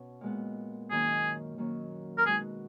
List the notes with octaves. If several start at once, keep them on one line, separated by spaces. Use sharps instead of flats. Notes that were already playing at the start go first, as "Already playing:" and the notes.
Already playing: B2 C#4
A#2 G#3 B3
F#2 D#3 A#3 C#4 G#4
D#3 F#3 A#3 C#4
A#4
B2 G#3 D#4 F#4 G#4